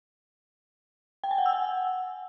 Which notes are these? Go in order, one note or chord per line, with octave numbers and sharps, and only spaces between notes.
G5
G#5
F#5
E6
F#5